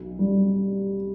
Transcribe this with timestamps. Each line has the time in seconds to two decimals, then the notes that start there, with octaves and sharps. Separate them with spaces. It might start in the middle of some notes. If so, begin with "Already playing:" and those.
Already playing: B1
0.19 G3